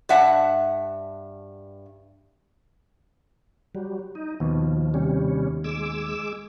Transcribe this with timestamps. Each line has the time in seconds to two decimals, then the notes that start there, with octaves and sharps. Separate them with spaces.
0.09 G2 E5 F#5 A5
3.75 F#3 G3
4.15 D#4
4.40 D#2 B2 F3
4.94 C3 G3 C#4
5.64 G#3 D6 E6